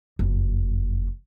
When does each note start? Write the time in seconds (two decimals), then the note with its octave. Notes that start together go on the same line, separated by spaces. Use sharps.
0.19 F#1 F2